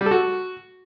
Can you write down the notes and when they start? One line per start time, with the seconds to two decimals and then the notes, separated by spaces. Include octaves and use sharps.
0.01 G3
0.06 A4
0.11 F#4